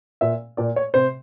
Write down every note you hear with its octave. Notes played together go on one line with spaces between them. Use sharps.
A#2 E5
A#2 D5
C#5
C3 C5